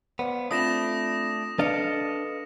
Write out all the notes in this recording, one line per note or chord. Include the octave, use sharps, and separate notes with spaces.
B3 C5 D5 F5
A3 C4 D4 F4 B5 D#6 A#6 E7
D4 A4 B4 D#5 F5 C#7